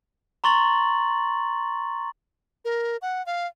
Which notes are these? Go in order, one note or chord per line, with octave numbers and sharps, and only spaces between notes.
A#5 C6 C#6 A6 F#7
A#4
F#5
F5